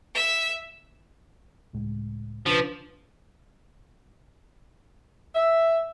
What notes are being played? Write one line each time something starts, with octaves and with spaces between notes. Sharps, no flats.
E5
C#2 A2 G#3
B1 C#3 F3 D4 B4
E5